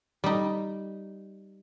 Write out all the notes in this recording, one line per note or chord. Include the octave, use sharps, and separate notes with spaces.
G3 D#4